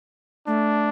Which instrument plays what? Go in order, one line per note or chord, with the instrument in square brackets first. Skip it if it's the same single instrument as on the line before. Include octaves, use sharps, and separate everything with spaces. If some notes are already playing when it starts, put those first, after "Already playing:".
[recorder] A3 [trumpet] D4